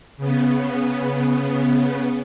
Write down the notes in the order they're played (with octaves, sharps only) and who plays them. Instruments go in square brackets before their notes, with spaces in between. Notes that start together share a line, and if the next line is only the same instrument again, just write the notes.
[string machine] C#3 B3